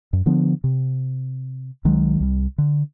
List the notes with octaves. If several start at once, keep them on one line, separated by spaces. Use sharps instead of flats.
F#2
D3 F3 B3 D4
C3
C2 D#3 F#3 G#3
C2 G3
D3